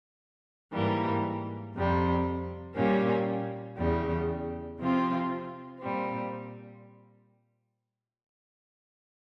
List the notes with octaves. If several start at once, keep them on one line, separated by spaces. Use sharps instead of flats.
G#2 E3 G3 A#3
F2 C3 G3
A#2 G3 A#3 C#4
E2 C#3 G3
C3 F3 C4 F4
A#2 G3 C4